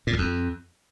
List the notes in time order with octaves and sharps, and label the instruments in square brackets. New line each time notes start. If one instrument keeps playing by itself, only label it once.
[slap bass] A#2
E2
F2